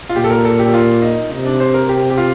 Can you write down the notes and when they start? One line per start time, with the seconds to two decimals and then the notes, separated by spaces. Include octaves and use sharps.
0.09 F4
0.16 A#2 G4
0.24 A4
0.30 A#4
0.45 A4
0.59 G4
0.74 F4
1.02 D#4
1.31 C3 D#4
1.46 D4
1.60 C5
1.74 A#4
1.89 C3 G4
2.10 G4
2.17 F4